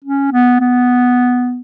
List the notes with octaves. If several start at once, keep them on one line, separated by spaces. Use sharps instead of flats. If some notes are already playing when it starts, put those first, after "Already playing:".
C#4
B3
B3